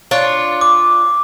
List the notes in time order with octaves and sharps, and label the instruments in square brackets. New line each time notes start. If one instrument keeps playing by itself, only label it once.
[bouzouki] D4 F4 C#5
[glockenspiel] D6